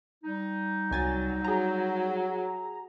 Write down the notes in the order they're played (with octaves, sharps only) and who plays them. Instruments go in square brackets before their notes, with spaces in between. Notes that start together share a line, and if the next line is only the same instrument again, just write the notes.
[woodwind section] G3 D#4
[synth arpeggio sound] C2 G#5 A6 [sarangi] F#3
[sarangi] F#3 [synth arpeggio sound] G#4 A#5